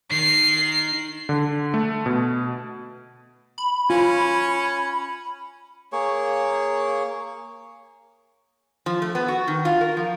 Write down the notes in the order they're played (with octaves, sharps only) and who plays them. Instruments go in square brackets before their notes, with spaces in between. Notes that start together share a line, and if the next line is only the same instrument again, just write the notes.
[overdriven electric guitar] D#3 [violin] C7
[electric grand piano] D3
A3
B2
[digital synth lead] B5
[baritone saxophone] C#4 [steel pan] F4
[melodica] A#3 G#4 C#5
[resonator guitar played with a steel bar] F3
A3
B3
F#4
D#3
F4
A#4
F3